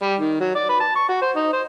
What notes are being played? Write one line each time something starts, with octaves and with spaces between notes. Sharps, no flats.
G3
D#3
F#3
D5
B4
A5
C#6
F#4
C5
D#4
C5